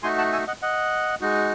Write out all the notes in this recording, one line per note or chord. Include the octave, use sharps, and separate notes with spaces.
A3 D#4 F#4 G#5 C6
F#5 A5
E5 G#5
D#5 F#5
D#5 F#5
G#3 D#4 F#4